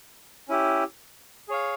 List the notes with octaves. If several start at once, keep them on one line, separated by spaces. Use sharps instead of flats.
C#4 E4 G4
G#4 C#5 F5